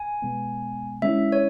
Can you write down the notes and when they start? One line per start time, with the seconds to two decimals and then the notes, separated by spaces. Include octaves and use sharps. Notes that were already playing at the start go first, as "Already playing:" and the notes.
Already playing: G#5
0.22 B2 G#3 B3
1.02 D3 G#3 C#4 E4 E5
1.32 C#5